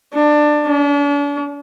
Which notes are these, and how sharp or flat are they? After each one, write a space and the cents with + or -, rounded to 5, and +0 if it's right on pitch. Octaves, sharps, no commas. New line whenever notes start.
D4 +20
D4 -40